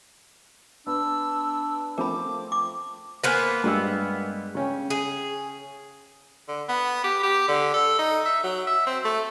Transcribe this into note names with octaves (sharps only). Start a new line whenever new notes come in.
B3 D4 E6
F3 A3 C4 A#4 B5 D6
D6
A#3 B3 B4 C5 G#5
G2 G#3 E6
C#3 C#4 G5
G#4
D3
B3
G4
G4
D3
A4
D#4
E5
F#3
E5
C4
A3